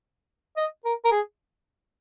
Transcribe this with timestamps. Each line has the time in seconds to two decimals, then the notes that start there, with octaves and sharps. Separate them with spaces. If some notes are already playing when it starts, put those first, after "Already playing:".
0.57 D#5
0.85 A#4
1.05 A#4
1.12 G#4